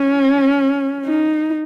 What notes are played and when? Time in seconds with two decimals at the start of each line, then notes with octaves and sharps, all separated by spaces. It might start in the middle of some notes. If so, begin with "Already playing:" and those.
Already playing: C#4
1.05 D#4